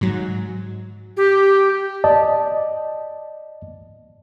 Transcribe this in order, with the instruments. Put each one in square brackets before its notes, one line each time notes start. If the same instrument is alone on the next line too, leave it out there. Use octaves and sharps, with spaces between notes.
[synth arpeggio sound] G#2 F#3
[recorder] G4
[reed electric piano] D5 D#5 A5